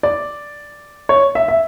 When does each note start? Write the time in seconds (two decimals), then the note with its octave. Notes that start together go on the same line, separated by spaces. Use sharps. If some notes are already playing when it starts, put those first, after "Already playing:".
0.03 D5
1.09 C#5
1.35 E5
1.48 E5